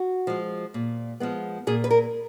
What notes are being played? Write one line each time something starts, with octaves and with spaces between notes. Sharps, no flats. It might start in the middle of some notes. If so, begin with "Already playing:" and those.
Already playing: F#4
F3 G#3
A#2
F3 G#3 B3
A#2 G#4
B4
A#4